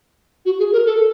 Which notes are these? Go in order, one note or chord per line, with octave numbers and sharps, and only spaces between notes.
F#4
G#4
A#4
A4